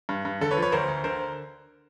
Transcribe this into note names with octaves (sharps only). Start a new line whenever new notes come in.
G2
G2
D3 A4
B4 C#5
F3
B4 C#5
D2 A#4 C5
D2
D3 A#4 C5